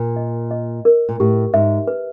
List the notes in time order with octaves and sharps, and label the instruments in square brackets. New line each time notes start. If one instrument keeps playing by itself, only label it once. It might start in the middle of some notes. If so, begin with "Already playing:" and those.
Already playing: [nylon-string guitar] A#2 [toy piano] A#4
[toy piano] D#5
D#5
A#4
[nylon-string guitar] A#2
[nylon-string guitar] A2 [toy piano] G4
[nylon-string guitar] G#2 [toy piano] E5
[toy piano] B4